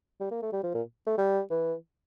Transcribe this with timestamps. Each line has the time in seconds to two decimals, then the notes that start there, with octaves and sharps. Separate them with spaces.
0.20 G3
0.31 A#3
0.42 A3
0.53 G3
0.64 F3
0.74 A#2
1.07 A3
1.18 G3
1.50 E3